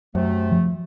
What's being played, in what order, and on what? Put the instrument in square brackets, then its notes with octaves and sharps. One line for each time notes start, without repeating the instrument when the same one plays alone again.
[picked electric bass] F#2 F#3 [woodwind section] C3 A3
[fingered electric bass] F3